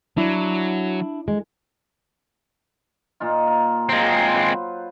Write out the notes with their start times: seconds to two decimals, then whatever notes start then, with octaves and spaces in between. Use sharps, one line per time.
0.17 F#3 D4 E4
1.28 G#3
3.20 A#2 D#4 F4
3.47 A#4
3.89 F#3 G#3 C4 F4
4.34 B4 C5